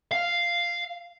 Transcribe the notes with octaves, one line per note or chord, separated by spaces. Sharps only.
F5